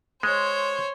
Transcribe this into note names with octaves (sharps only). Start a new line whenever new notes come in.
G#3 C5 C#5